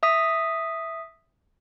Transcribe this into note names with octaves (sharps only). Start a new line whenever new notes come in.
E5 D#6 B6